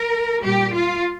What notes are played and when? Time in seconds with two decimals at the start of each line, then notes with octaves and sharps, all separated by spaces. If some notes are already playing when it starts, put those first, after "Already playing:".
Already playing: A#4
0.43 A#2 G3 G4
0.73 F4